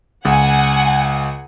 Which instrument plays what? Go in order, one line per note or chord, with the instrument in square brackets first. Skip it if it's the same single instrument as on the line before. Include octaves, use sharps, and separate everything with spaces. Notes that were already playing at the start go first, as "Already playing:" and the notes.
[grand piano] C#2 [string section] F#5 G#5